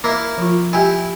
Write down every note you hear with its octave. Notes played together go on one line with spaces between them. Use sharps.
A#3 E4
F3 F4
E4 G4 G5 G#5